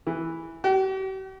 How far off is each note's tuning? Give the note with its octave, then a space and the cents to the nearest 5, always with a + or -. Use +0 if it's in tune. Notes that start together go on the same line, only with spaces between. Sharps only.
E3 -5
G4 -45